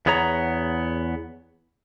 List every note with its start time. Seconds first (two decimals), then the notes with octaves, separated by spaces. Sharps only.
0.06 E2 B3 G#4 C#5 A#5